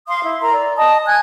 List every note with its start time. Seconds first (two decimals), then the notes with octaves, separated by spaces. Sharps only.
0.08 F5 C6 D#6
0.23 E4
0.41 E4 A#4 A#5 C6
0.53 D5
0.77 D#5 A5 D#6
1.06 G#5 F#6 G#6